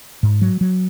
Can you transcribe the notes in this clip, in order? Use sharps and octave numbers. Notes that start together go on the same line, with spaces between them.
G#2
F#3
F#3